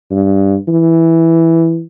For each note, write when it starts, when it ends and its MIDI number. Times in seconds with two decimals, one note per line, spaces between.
0.11 0.55 43
0.68 1.82 52